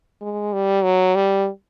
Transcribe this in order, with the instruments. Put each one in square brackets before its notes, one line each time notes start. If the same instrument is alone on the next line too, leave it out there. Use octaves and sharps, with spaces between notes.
[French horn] G#3
G3
F#3
G3